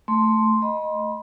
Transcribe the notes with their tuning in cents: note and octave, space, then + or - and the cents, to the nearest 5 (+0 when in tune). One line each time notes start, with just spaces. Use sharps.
A3 +0 C6 +0
D#5 +0 B5 -35